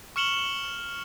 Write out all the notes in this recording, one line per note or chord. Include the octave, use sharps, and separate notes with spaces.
C#6 F6 C#7 E7 F#7 G7